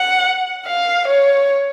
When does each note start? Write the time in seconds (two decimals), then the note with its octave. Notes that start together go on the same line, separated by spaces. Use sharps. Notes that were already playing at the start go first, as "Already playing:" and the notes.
Already playing: F#5
0.67 F5
1.07 C#5